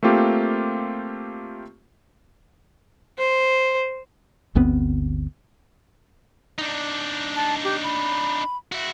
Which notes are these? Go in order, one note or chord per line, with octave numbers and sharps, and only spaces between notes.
A3 A#3 C4 F4 G4
C5
G1 D2 B3 C4
D4 D#4
A5
G4
B5
E4 F#4